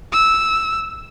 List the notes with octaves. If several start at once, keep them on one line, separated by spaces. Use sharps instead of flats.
E6